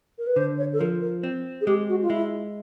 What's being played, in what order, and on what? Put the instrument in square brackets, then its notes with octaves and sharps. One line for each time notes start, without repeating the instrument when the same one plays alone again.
[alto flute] A#4
B4
[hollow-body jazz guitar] D3 [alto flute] C5
[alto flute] C#5
A4
[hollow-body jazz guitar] F3 [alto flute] A#4
[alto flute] A#4
[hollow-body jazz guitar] C4
[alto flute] G#4
[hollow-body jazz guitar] G#3 [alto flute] G4
[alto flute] F#4
F4
[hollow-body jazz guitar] G#3 [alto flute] E4